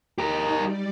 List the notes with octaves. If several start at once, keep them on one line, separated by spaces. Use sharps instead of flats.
D#4 G4 A#4
G3 D5